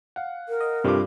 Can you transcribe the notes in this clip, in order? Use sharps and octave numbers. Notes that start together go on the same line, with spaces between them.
F5 F#5
A#4
D#5
G2 C3 G3 A3 F4 D6